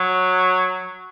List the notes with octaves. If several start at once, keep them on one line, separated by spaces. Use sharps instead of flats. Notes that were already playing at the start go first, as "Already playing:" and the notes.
Already playing: F#3